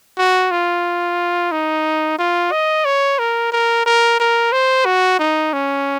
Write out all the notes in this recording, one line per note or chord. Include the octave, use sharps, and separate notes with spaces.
F#4
F4
D#4
F4
D#5
C#5
A#4
A#4
A#4
A#4
C5
F#4
D#4
C#4